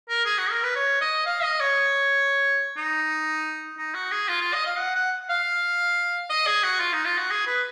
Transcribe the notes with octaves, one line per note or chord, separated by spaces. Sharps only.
A#4
G#4
F#4
A#4
B4
C#5
D#5
F5
D#5
C#5
D#4
D#4
F#4
G#4
F4
F4
D#5
F5
F#5
F#5
F5
D#5
G#4
F#4
F4
D#4
F4
F#4
G#4
B4